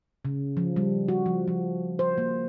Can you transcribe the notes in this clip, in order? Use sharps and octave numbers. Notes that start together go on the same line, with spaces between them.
C#3
F3
G3
F#4
F3
F3
C5
A#3